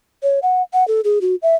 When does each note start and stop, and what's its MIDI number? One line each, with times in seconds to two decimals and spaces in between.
0.23 0.39 73
0.43 0.62 78
0.73 0.86 78
0.88 1.01 69
1.04 1.19 68
1.21 1.35 66
1.43 1.55 76